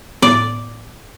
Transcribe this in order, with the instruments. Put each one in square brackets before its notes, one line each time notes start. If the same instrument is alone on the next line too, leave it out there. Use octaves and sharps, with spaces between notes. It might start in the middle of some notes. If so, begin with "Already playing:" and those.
[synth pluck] A2 B3 [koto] D5